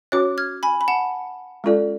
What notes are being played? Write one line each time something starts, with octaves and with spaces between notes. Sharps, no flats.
C#4 F#4 C#5 D6 F#6
F6 G#6
G#5 B5
B5
F#5 A5
G#3 C#4 F4 A4 D5